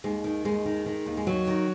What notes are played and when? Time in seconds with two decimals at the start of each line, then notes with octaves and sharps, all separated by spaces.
0.04 D#2 G#3
0.24 D#3
0.45 D#2 G#3
0.66 D#3
0.86 D#3
1.06 D#2
1.17 G#3
1.26 D#3 F#3
1.47 D#3